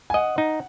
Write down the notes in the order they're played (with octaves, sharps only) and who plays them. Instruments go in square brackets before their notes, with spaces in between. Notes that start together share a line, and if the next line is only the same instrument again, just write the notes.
[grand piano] G#5
[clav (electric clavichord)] D#5 [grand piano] F#5
[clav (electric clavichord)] D#4